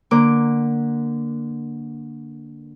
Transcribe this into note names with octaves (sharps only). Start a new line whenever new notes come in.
D3 A#3 D6